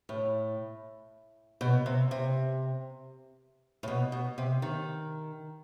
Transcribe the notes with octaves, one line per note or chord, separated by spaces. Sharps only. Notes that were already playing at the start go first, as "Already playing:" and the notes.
A2
B2
C3
C3
A2
B2
B2
C3
D#3